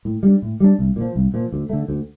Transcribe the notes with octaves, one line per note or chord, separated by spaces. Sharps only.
A2
G3 D4
A2
G3 D4
C2
A#2 F3
C2
A#2 F3
D2
D3 A3
D2